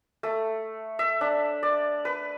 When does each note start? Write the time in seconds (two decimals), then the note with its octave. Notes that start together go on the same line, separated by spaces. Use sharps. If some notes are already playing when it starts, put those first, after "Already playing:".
0.23 A3
0.99 E5
1.21 D4
1.63 D5
2.05 B4